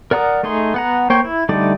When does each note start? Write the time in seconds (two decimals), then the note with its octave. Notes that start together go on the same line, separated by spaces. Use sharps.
0.11 A#4 D5 F#5 A#5 D#6
0.43 A3 D#4 G#4 C6
0.74 B3 F#5 A#5
1.10 A#3 C5 C#5 G5
1.24 E4
1.49 D3 G3 A3 D#4 D5